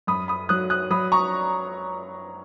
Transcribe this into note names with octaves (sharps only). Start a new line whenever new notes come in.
F#2 B5 D#6
B5 D#6
F#3 D#6 F#6
D#6 F#6
F#3 B5 D#6
A#5 C#6